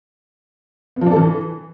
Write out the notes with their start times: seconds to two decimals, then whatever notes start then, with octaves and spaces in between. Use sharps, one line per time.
0.96 B3
1.01 F3
1.06 D4
1.11 A4
1.16 E3